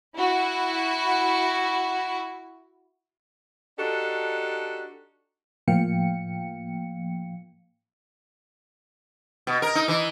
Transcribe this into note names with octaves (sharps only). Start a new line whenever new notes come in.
E4 F#4
D4 D#4 F#4 G4 A4
A2 F3 A#3 F5 G5 C#7
B2
A#4
D#4
E3